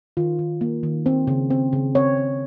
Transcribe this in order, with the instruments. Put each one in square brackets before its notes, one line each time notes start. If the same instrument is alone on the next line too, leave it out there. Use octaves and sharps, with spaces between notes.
[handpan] D#3 F4
D#3
A#3
D#3
C4
C#3
C4
C#3
C4 C#5
C4